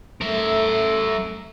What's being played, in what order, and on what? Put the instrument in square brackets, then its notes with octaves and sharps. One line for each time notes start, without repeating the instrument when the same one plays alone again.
[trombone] A3 [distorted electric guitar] A#4 E5